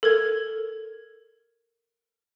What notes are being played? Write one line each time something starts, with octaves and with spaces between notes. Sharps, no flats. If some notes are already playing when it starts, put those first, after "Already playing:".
A4 A#4 G#6